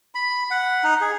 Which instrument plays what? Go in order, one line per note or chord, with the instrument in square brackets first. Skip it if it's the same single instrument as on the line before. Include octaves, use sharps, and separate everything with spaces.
[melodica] B5
F#5
D#4
G#4